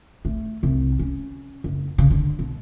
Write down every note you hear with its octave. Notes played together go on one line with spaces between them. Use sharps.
A3
C2
C#4
F#1
C#3
D3
B2